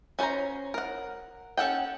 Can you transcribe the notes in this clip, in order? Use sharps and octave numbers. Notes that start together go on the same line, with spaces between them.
C#4 F#4 C5 C#5 A#5
A#4 F#5
C#4 A4 F#5 G5